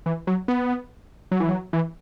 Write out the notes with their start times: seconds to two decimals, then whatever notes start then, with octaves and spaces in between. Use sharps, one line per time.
0.06 E3
0.27 F#3
0.48 B3
1.32 F#3
1.40 E3
1.49 F#3
1.73 E3